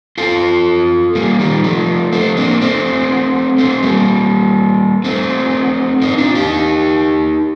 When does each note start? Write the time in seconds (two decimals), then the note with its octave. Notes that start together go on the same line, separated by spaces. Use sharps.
0.18 F4 A4
1.15 G3 A#3
1.39 D#3 G3
1.64 F3 A3
2.13 A3 C4
2.37 A#3 D4
2.62 A3 C4
3.58 A3 C4
3.83 G3 A#3
5.04 A3 C4
6.02 C4 D#4
6.18 D4 F4
6.35 D#4 G4